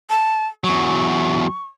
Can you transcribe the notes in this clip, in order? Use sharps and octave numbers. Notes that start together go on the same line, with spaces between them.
A5
E2 F#3 C#6